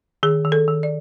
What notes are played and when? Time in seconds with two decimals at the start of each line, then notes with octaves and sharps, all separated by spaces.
0.23 D#3 G#4
0.45 D#3
0.52 A4
0.68 D#3
0.83 D5